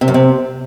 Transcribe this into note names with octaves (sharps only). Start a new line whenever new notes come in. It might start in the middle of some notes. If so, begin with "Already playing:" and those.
C3
F#2
C3